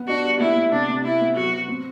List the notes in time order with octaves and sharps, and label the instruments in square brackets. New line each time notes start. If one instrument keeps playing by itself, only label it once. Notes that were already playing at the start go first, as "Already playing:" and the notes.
Already playing: [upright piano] B3
[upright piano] D4 [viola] F#4
[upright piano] G3
[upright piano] B3 [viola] E4
[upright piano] B3
[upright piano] C3 [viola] D4
[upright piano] C3
[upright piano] C3 [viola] E4
[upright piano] B3
[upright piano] F#3 [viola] F#4
[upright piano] F#3
C4